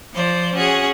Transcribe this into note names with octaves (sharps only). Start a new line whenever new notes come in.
F3 C5 D5
C#4 F#4 G#4